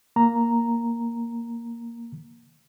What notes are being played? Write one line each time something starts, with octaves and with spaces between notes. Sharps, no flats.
A#3 A#5